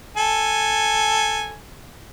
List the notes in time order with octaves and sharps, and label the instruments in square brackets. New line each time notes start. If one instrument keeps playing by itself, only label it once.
[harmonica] A4 G#5